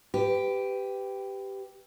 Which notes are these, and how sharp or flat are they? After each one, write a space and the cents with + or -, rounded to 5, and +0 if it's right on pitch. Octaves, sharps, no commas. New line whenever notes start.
G4 +0 B4 +25